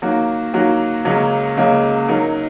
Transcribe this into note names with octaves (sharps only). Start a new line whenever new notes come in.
D#3 F#3 A#3 F#4
D#3 F#3 A#3 F#4
C#2 C#3 F#3 A#3 C#4
C#2 C#3 F#3 A#3 C#4
F#3 D#4 A#4